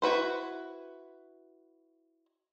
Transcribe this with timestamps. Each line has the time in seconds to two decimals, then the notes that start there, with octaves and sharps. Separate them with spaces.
0.02 E4 F#4 B4 C5